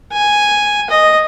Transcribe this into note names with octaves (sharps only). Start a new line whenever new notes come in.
G#5
D#5